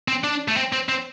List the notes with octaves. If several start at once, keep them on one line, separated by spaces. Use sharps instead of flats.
C4
D4
A3
C4
C4
C4